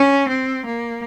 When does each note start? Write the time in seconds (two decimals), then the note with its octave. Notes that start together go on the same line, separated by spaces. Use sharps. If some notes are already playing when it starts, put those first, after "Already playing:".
Already playing: C#4
0.28 C4
0.64 A#3